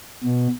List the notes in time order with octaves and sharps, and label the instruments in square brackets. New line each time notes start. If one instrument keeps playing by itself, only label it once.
[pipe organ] B2